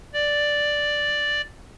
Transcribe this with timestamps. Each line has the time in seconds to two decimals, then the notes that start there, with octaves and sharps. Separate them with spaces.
0.14 D5